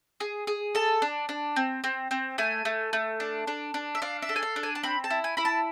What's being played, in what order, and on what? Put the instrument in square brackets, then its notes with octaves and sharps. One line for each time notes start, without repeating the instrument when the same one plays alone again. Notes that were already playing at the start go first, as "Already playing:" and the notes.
[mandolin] G#4
G#4
A4 A5
D4
D4
C4
C4
C4
A3 G#5
A3
A3
D4
D4
D4
E5
D4 F5
E5
A4
G#5
F5
D4
G#5
A5
C4 B5
A5
E4
G#5
E4 B5
A5